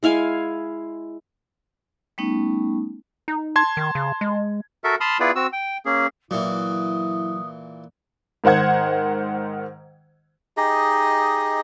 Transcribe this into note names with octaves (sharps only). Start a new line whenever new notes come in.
G#3 E4 F5 G#5
G3 A3 B3 C#4 D#4
D#4
A5 C6 G#6
D#3
C#3
G#3
F#4 A4 A#4 E5
A5 B5 C6 D#6 F6
B3 E4 F4 G#4 B4 D5
C4 F#4 E6
G5
A#3 C#4 G#4
A#2 E3 F#3 E4 D#6
G#2 D#3 C5 F#5 G#6
D#4 G4 G#4 D#5